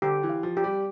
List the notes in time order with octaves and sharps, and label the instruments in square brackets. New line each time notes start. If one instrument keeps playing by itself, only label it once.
[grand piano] D3 [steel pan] G4
[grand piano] E3
[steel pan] F5
[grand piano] F3
[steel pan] G4
[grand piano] G3